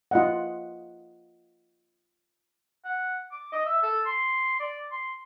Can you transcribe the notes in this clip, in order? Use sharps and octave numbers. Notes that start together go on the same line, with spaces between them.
F4 D#5 F#5
F#5
D6
D#5
E5
A4
C6
D5
C6